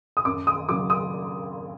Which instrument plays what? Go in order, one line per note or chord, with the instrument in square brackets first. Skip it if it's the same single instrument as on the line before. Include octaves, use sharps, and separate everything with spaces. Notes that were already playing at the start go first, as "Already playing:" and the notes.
[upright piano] D#6
F#2 D6
D#6
C#3 F#3 D6
D#6